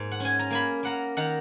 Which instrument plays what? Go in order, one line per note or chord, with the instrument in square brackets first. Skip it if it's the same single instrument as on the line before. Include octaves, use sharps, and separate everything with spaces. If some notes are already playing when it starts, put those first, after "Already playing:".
Already playing: [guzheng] G#2 A#3
F#5
C#4 G#5
A#5
A#3 G#5 B5
A#3 F#5 A#5
D#3 F#5 A#5